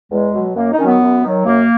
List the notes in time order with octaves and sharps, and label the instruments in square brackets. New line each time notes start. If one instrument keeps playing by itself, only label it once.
[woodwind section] E2 G#3
B2 F#3
F#2 A#3
D#4
D#3 C#4
F#3 B3
F#2
D#3 F#3
F#2 A#3